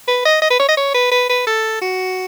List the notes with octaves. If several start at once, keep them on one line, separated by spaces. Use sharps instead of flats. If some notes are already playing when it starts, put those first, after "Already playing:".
B4
D#5
D#5
B4
C#5
D#5
C#5
B4
B4
B4
A4
F#4